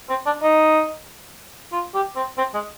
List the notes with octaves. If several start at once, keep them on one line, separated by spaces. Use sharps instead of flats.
C4
D4
D#4
F4
G4
C4
C4
G#3